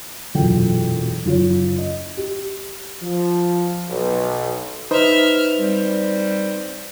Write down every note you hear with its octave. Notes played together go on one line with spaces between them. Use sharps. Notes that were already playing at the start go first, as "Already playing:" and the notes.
E1 F#2 A#2 A4 G5
F#1 F4 C#5
D#5
G4
F3
B1
D#4 B4 C5 E5 F6
G3 C4